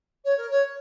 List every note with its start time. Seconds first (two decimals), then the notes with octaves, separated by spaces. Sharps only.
0.25 C#5
0.37 A#4
0.51 C#5